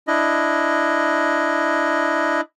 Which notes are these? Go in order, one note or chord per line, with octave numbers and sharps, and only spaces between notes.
D4 E4 D#5